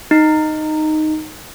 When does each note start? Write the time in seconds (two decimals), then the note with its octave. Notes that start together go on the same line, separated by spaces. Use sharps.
0.11 D#4